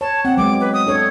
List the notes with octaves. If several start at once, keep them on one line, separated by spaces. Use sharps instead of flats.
C#5 A5
C4 F#5
F#3 G#3 B3 D6
B4
D#6
D4 A4 C#5